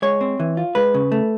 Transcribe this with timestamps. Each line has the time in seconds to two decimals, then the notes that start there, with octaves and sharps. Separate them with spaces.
0.02 G#3 C#5
0.21 C4
0.40 E3
0.57 F4
0.75 G#3 B4
0.94 C#3
1.12 A3